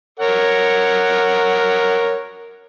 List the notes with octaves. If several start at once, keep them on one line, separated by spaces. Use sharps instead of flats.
A#4 C#5 F#5